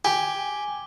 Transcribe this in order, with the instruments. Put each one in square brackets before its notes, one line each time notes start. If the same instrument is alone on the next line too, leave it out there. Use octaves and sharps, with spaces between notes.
[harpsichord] G4 [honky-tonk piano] G#5 [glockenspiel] D6 G7